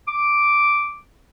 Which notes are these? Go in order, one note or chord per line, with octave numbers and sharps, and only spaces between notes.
D6